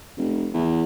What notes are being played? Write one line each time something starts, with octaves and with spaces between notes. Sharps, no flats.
F1
E2